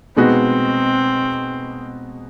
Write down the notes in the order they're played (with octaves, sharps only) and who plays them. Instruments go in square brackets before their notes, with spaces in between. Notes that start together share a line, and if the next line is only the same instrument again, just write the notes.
[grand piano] B2 G#3 B3 D#4 F#4 [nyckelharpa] C4